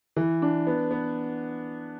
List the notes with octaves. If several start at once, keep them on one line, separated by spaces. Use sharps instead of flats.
E3
D4
B3
B3